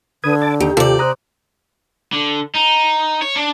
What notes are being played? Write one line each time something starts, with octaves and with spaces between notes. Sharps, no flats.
D3 B4 D#6 G#6
D5 A5
D#2 D#3 G4
D#2 C3 F4 A4 D5
C5 A#5 D#6 F#6
D3
D#4
C#5
D4